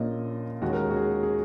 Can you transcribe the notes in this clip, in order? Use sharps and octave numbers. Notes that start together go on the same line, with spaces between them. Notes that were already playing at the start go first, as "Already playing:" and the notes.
Already playing: A#1 A#2 A#3 C#4 D#5
D#2 D#3 G#3 C#4 F#4
A#4
G#4
F#4
G#4
G#4